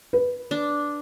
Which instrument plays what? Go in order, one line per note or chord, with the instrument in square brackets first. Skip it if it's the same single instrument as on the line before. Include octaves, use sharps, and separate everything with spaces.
[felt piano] B4
[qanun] D4